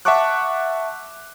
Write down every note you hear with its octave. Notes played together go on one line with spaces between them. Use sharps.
E5 F#5 A5 C#6 D6 F#6